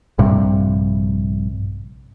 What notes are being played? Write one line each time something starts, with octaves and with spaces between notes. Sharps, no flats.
A#1 G2 C3 G3